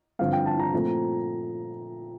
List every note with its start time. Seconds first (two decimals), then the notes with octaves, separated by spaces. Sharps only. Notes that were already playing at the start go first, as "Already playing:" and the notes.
0.19 G2 D3 F3 C4 F5
0.33 G5
0.46 A5
0.59 A#5
0.73 A#2 F3 A3 C4